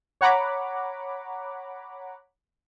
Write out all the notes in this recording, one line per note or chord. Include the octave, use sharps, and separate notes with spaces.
C#5 F#5 A#5 B5 D6